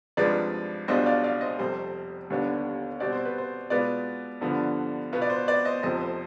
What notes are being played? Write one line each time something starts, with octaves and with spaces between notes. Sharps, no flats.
G#1 G2 F3 G#3 B4 D5
B1 B2 G3 D4 F4 C5 D#5
D5 F5
D5 F5
C5 D#5
F1 F2 C3 G3 C5
D#2 D3 G3 B3 D4
B2 G3 C4 D5
C5
B4
C5
B2 G#3 B3 F4 B4 D5
G2 D3 F3 B3
B2 B3 F4 B4
D5
C5
B4 D5
C5 D#5
F1 F2 C3 F3 C5 D#5
C5